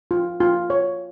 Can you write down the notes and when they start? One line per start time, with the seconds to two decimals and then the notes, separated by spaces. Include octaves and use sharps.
0.11 F4
0.40 F4
0.70 C#5